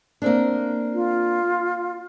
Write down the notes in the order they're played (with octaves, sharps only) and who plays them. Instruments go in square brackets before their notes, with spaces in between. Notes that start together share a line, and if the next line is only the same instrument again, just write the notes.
[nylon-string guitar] A#3 C4 D4
[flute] F4